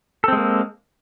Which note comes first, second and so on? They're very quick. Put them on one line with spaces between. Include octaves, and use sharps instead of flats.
A4 C4 G#3 A#3